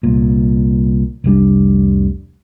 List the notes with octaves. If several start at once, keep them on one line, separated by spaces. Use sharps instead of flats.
C2 A#2
F1 C2 G3 D4